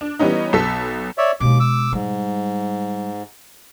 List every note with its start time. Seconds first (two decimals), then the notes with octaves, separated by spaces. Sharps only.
0.01 D4
0.19 E3 G3 B3 C#4 D#4
0.53 B1 A4 B6
1.18 C#5 D5 E5
1.40 D#2 B2 G#3 D6
1.60 D6 E6
1.93 G#2 G3